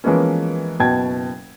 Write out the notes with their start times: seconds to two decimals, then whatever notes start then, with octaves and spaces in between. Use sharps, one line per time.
0.04 E3 F3 G#3 A#3 B3 C#4
0.79 F#1 B2 F#4 G5 A5 G#6